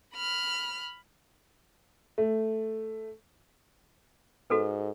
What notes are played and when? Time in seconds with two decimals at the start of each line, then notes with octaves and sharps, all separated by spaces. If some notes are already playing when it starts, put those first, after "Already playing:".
0.15 B5 F6
2.18 A3
4.50 G#2 F#4 A4 B4